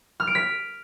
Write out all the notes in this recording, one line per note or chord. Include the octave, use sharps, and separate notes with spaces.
F6
D7
B6